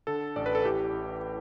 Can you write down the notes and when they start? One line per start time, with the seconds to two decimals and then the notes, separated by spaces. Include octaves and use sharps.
0.07 D3 A4
0.36 A1 D5
0.46 B4
0.55 A4
0.65 E3 G4
0.93 A1